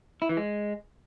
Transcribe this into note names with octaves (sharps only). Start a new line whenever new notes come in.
E4
E3
G#3